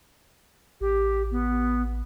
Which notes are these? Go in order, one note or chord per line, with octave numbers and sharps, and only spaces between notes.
A1 G4
B3